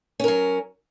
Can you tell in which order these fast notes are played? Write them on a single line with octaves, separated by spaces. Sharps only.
C#4 A#4 F#3